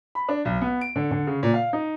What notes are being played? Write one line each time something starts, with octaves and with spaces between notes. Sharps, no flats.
B5
D4
B1
B3
D7
D3
D3
C#3
A#2
F5
D#4